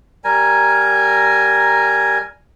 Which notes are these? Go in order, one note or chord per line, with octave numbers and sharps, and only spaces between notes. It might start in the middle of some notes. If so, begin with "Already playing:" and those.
G3 A#4 G#5 A#5